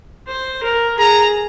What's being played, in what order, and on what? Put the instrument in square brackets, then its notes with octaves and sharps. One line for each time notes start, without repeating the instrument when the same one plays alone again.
[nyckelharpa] C5
A#4
[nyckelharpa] G#4 [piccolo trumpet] A#5